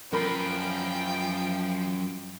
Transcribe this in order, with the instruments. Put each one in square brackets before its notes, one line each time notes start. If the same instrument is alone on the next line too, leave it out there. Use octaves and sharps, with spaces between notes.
[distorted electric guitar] F#2 B4 [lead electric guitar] F3 [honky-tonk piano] A#4 B5 [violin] G5